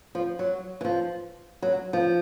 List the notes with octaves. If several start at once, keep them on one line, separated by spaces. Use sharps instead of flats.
F3
F#3
E3
F3
F#3
F3